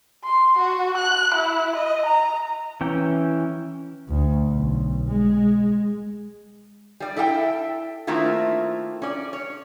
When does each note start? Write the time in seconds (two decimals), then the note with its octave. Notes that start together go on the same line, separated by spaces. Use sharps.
0.24 C6
0.59 F#4
0.97 F#6
1.35 E4
1.77 D#5
2.06 A#5
2.81 E3 C#4 G5
4.09 D2
4.50 B1
5.09 G#3
7.00 G3 D5
7.16 E4 A4 E5 F5 G5
8.07 D#3 A3 A#3 C4 E4 F4
9.02 C#4 D5
9.33 C#5